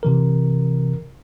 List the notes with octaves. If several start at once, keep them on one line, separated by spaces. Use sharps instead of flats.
C3 E3 A#4